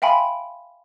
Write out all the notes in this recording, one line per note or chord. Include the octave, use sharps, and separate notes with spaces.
E5 F5 G5 G#5 B5 C6